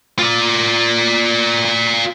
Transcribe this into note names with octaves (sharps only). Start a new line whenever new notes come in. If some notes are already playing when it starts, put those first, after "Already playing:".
F4 D5